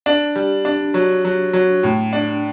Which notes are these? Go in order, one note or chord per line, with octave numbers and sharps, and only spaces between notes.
D4
G3
D4
F#3
F#3
F#3
A2
D4